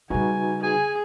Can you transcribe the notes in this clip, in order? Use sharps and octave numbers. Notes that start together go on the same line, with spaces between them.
C#3 G3 D#4 F#4 B4 G#5
G#4 G#5